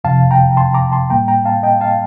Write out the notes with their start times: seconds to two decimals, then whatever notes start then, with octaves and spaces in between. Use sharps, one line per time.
0.04 F2 C3 F3 F5 A5
0.31 G5 A#5
0.57 A5 C6
0.74 A#5 D6
0.92 A5 C6
1.10 A2 G3 A#3 G5 A#5
1.28 G5 A#5
1.45 F5 A5
1.63 D#5 G5
1.81 F5 A5